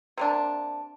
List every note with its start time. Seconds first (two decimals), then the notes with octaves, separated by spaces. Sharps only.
0.18 C3 A#3 D4